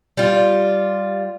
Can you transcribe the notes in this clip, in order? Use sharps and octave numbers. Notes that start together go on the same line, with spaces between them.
G3 F4